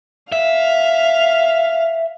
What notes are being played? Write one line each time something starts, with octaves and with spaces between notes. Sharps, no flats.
E5 F5